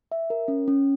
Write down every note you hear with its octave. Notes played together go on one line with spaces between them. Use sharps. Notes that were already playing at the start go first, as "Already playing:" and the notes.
E5
A#4
C#4
C#4